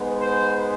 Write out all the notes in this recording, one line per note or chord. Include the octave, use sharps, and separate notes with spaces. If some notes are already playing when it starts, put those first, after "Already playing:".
Already playing: G#2 G#3 B3
C5